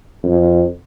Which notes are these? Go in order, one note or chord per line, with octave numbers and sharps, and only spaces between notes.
F2